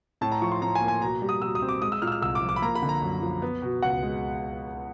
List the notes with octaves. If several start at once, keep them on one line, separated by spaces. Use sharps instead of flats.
A2 A5
A#5
F3 C#6
C6
A2 A#5
G#5
A#3
G#5
B2 A#5
G3
D#6
B2 E6
D#6
C4
D6
G#3 D#6
E6
A#2 F6
E6
F6
C2 E6
D6
F3
D6
B5
A#3 A#5
B5
D3
A#5
F#2
F3
B3
B2
C#2 F#5
G#3